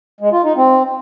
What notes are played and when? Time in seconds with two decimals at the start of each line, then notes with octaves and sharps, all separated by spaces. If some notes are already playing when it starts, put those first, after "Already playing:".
0.21 G#3
0.33 F4
0.44 D#4
0.56 C4